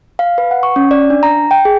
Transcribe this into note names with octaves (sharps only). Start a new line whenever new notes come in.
F5
B4
F#5
C#6
C#4
D5
D4
A#5
G5
G#4